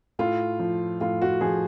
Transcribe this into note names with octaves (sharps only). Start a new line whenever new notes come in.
A2 F4
F3
A2 F4
F#4
F3 G#4